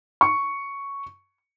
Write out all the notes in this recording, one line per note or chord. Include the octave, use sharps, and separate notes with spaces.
C#6